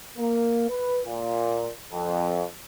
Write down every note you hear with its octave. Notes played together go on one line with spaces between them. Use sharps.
A#3
B4
A#2
F2